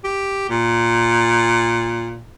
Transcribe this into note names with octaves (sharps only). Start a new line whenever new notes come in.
G4
A#2